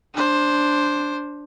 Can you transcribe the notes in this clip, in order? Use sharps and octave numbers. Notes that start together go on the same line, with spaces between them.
D4 C5